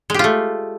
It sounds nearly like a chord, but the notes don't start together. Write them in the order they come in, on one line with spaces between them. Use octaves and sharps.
G#3 G4 F4 A3